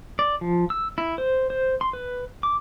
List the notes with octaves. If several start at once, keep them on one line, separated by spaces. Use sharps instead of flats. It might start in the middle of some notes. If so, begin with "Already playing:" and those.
D5
F3
E6
E4
C5
C5
C6
B4
D6